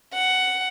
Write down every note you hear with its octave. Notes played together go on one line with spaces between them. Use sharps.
F#5